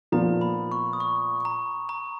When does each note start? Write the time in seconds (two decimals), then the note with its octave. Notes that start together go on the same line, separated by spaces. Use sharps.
0.12 A#2 F3 B3 A#5
0.41 B5
0.72 C#6
0.93 D#6
1.00 C#6
1.45 A#5
1.89 A#5